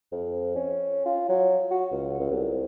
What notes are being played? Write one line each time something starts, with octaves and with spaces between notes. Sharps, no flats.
F2
C#4
F4
F#3
F#4
C#2
C#2
C2